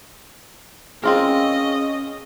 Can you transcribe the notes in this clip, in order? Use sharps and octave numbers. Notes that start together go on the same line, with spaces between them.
C4 C#4 F4 G#4 A#4 D#5 F5